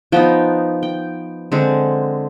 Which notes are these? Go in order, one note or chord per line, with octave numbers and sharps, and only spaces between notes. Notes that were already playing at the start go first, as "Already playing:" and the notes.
F3 B3 D#4 G5
G5
D3 G#3 C4